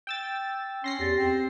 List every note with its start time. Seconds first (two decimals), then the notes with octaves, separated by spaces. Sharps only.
0.07 G5 E6 A6
0.84 C#4 C6 A#6 C7
0.99 E2 G4 A6
1.18 C4